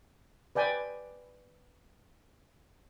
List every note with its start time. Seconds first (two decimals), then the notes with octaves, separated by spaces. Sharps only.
0.55 B4 D5 G5 G#5